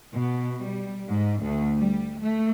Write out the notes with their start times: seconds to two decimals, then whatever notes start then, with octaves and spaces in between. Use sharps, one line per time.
0.13 B2
0.61 G3
1.09 G#2
1.43 D2
1.78 G3
2.21 A3